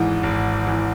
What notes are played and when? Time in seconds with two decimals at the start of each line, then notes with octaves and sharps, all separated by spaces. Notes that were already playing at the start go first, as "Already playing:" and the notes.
Already playing: G#1 G#2 E3
0.23 G#1
0.67 E3